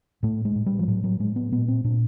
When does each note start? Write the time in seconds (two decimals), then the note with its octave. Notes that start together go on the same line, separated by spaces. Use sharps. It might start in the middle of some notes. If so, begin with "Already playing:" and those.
0.23 A2 A3
0.45 G#3
0.55 A2
0.66 G3
0.79 F3
0.88 A2 F#3
1.04 F#3
1.20 A2 G#3
1.36 B3
1.52 A#2 B3
1.68 C4
1.84 A#2 D4